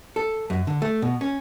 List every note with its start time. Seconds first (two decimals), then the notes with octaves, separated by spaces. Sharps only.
0.16 A4
0.50 F#2
0.67 D3
0.82 A3
1.02 B2
1.21 C#4